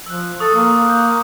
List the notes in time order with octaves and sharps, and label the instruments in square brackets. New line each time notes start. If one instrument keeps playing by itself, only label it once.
[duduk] F3 [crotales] E6 F#6
[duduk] A4 [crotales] C#6 D#6 C#7
[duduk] A#3
[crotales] F#6 G6